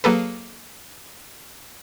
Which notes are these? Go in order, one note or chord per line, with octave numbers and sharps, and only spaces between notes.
F#3 A#3 G#4 A4 B4